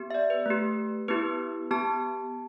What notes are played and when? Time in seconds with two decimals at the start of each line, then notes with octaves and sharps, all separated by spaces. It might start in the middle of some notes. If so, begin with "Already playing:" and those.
Already playing: B3 G4
0.10 E5
0.14 D5
0.30 B4
0.46 A3 G4
1.08 B3 E4 G4 B4
1.71 B3 G4 A5